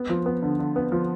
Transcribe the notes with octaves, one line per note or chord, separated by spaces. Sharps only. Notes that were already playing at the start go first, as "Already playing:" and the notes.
Already playing: B3
F3
B3
D3
D3
B3
F3